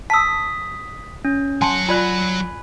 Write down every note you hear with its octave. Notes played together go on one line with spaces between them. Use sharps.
A5 D#6 E6 B6
C#4
F#3 F#5 G#5 A5 C6
F4 D5 G#5 B5 F#6